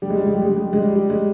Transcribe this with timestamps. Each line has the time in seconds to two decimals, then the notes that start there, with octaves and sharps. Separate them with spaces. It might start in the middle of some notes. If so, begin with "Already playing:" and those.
0.02 G3
0.10 G#3
0.17 G3
0.26 G#3
0.34 G3
0.42 G#3
0.49 G3
0.56 G#3
0.65 G3
0.73 G#3
0.81 G3
0.95 G3
1.10 G#3